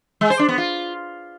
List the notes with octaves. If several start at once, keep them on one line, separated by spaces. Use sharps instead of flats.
G#3
C5
D4
B3
F4